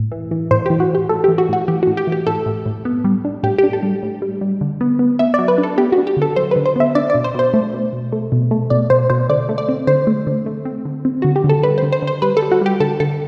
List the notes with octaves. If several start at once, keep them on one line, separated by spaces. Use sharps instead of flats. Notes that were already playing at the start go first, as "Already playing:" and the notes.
Already playing: A2
E3
E3
A2 C5
G4
E3
F#4
A2 G4
A2 A4
G4
E3
F#4
A2 F#4
E3 G4
F#4
A2
G4
E3
G4
A2 A4
A2
A2
B3
G3
D4
A2 G4
G4
D4
A4
G3
A2
G3
G3
D3
B3
B3
B3 E5
D5
F#3
B4
D4
A4
B3 G4
F#4
D4
G4
D3 A4
F#3 C5
B4
D3
C5
B3 E5
D4 D5
D5
B2
C5
B2 C5
A3
B2
B2
A3
B2
A3
B2 D5
B2 C5
B2 C5
D3 D5
A3
D5
C4
D3 C5
A3
D3
A3
C4
D3
C4
D3 F#4
G4
D3
A4
G3 B4
C5
D3
C5
D3
C5
G3 B4
A4
G3
F#4
G3 G4
D3 A4
D3 A4